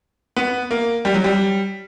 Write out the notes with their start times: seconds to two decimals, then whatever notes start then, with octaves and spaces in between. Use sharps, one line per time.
0.36 B3
0.71 A#3
1.05 G3
1.14 F#3
1.24 G3